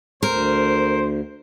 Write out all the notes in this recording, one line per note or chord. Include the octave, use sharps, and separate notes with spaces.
D2 A#4 C5